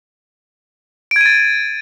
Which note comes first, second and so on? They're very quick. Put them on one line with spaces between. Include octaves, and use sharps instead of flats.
D7 G#6 D#7 A6